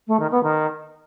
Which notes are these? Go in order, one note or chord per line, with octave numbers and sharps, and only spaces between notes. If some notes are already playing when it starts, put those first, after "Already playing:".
A3
D#3
B3
D#3